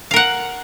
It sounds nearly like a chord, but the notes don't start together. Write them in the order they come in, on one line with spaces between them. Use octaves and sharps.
F5 A#4 F#5